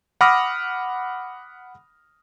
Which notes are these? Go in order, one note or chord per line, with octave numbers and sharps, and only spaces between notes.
F#5 B5 D6 D#6 F6 A#6